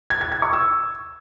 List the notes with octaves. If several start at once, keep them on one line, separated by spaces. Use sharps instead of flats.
G#6
G#6
G#6
C#6
E6